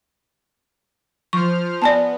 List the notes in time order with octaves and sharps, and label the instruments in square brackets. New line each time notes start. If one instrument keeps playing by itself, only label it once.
[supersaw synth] F3 C5 F6 [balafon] C#6
[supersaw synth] B3 [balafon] D5 G#5 A5